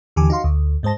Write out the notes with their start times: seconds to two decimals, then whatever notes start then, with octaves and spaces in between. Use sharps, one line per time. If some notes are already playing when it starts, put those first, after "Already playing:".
0.16 D#2 D3 E3 G4 G#5 D6
0.30 D#4 F#4 F5 C6
0.44 D2
0.83 G#2 G#3 C5 A5 A#6